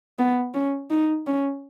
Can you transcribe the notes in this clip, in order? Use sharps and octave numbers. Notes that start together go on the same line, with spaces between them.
B3
C#4
D#4
C#4